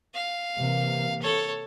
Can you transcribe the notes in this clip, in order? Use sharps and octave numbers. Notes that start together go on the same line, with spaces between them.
F5
C3 E3 A#3
A4 C#5